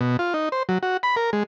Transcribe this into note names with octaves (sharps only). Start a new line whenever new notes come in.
B2
F4
D#4
C5
F#3
F#4
B5
A#4
G#3